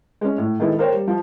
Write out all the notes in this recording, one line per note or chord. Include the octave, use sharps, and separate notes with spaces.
G#3 C#4
A2
D#3 G#3 B3 E4 A4
A#3 A#4 C5 C#5 G5
G3
F3 F4